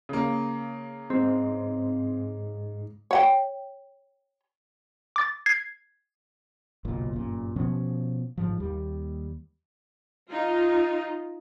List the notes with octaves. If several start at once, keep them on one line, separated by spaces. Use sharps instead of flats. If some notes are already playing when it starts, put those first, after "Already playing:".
C#3 A#3
G#2 G#3 C4
C#5 F#5 G5
D6 A6
G#6 C7
F#1 B1 A#2
G1 F#2 A#2
B2 F3 B3 C#4
A1 G#2 F3
D#2 G3
D#4 F4